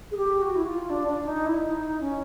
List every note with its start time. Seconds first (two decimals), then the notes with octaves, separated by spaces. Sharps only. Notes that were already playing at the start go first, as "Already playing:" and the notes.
0.11 G#4
0.17 G4
0.42 F#4
0.55 E4
0.66 F4
0.90 D4
1.08 D4
1.27 D#4
1.46 E4
1.64 D#4
2.00 C#4